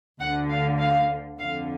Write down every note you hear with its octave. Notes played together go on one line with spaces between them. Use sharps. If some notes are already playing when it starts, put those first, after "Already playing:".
D2 D3 F#5
F5
F5
F2 D3 F5